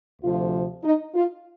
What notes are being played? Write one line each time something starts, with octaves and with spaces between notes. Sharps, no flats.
D2 C3 F3 F4
D#4
F4